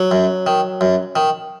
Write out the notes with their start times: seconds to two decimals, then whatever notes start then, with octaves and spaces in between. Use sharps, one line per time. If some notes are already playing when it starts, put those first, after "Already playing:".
Already playing: F#3
0.11 F#2
0.47 D#3
0.81 F#2
1.16 D#3